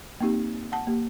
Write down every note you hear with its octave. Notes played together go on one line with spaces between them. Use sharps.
A#3 C4 D#4 G4
F#5 A5
A#3 G4